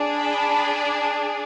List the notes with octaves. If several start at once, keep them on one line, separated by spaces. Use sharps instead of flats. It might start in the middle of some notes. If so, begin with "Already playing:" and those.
Already playing: D4 G#4
B5